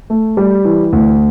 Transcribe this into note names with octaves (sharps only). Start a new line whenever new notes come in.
A3
G3
E3
D2